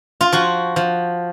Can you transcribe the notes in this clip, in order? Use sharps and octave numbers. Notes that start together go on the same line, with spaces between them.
F4
F3 F#4
F3